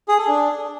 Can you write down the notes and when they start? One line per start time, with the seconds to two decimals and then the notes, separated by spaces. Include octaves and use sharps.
0.08 G#4
0.18 A4
0.28 D4